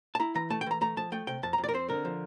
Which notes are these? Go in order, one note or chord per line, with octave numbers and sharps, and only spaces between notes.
A5
E4 A#5
E3 A#5
A3 A5
G5
E3 A#5
A3 A#5
F3 A5
A3 G5
C3 G5
F2 A5
A#5
F2
D5
A#4
C4 C5
D3 A#4
F3